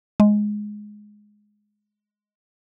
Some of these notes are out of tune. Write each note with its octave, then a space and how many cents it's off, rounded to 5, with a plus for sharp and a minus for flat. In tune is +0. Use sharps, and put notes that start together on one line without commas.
G#3 +5